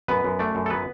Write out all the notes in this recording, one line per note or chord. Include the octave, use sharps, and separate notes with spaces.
F#2 B3 B4
F#2
A3 D4 D5
F#2
A4
F#3 B3 B4